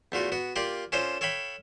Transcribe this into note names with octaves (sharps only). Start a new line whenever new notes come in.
E2 A3 F4 F#4
B3 F#4
A#3 F4 G4 D5
C#4 D4 F4 A4 C5
A4 C#5 F5 G5 B5